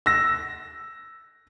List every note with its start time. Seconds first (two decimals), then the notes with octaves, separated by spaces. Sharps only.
0.06 E6 A#6